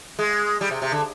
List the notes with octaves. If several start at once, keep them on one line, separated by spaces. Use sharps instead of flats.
G#3
G3
C3
C3
D3